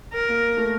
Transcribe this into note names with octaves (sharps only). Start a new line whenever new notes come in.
A#4
A#3
A3